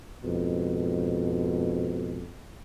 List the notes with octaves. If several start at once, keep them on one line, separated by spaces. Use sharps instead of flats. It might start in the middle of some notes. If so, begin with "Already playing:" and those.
F2 G#2 B2